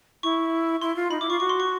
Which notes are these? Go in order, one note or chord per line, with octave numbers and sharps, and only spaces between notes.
E4 C#6
E4 C6
F4
D#4 B5
E4 D6
F4 C#6
F#4 C#6
C6
C#6